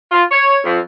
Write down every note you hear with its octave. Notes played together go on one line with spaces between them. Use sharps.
F4
C#5
F2